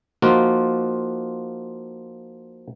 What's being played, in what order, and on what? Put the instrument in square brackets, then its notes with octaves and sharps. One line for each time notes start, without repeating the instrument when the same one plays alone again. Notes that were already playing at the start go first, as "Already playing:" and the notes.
[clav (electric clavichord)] F3 A#3 D#4 F4 F#4